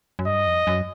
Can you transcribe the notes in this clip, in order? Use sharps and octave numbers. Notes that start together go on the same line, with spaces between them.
F#2
G2 D#5
F2
F#2